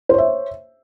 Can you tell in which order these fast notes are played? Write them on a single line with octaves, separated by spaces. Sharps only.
C5 C#5 E5